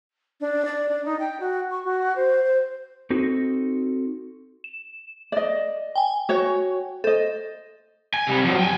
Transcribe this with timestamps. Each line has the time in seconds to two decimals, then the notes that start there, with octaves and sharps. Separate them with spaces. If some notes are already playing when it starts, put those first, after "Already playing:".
0.41 D4
0.65 D5
0.89 D4
1.05 D#4
1.19 G5
1.40 F#4
1.71 C#6
1.85 F#4
2.16 C5
2.44 C5
3.10 C4 D#4 F#4 A4
4.64 E7
5.32 D5 D#5
5.96 G5 G#5
6.29 F#4 C#5
7.04 A4 C5 D#5
8.14 G#5
8.27 C3 G3
8.45 F3 F#3
8.59 G5 G#5